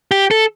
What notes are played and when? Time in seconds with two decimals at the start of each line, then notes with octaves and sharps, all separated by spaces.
0.11 G4
0.31 A4